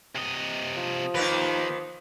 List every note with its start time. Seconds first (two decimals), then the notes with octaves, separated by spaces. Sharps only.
0.15 C3 D#5
0.77 F3
1.15 D#2 D#3 A#3 B4